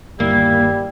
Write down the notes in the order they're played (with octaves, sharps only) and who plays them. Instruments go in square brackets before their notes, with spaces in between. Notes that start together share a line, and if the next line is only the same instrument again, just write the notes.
[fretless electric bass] G1 D#2 [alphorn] G3 [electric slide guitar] A#3 [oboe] E4